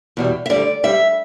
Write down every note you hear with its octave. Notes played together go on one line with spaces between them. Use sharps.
E2 B2 G3
E5
D2 D3 G3 D5
G2 G3 E5